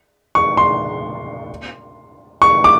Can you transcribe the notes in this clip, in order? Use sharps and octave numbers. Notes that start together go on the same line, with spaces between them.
C#6
C6
C#6
D6